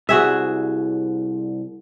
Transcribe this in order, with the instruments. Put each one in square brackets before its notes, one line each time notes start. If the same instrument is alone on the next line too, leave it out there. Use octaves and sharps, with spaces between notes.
[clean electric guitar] C2 [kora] F#4 G#4 E5